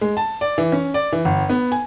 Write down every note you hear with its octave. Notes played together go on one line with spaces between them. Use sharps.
G#3
A5
D5
E3
C#4
D5
E3
G1
B3
G#5